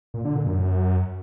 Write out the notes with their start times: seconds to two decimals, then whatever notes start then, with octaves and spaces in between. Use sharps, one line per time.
0.14 A#2
0.25 D3
0.36 A#2
0.46 F#2